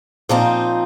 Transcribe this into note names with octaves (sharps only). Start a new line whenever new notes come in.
A#2 F3 C4 D#4 C5